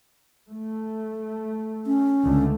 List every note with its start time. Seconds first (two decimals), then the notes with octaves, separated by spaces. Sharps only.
0.48 A3
1.87 C#4
2.24 C#2 D3 A3